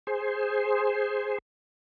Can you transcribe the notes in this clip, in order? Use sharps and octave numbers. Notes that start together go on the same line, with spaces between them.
G#4 C5